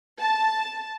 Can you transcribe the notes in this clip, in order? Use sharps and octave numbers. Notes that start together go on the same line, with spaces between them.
A5